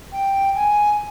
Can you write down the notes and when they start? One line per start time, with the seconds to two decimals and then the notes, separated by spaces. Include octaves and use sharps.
0.12 G5
0.55 G#5